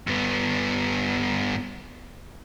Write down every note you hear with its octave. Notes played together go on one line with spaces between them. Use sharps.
G2 B3